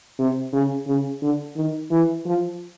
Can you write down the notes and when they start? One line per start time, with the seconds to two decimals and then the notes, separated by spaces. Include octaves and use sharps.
0.19 C3
0.53 C#3
0.87 C#3
1.22 D3
1.56 D#3
1.91 E3
2.25 F3